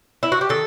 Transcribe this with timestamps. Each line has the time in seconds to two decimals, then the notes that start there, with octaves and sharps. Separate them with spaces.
0.23 E4
0.32 F#4
0.41 G4
0.49 D#3 A4